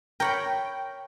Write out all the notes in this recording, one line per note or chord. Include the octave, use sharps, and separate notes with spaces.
A#4 C#5 G5 B5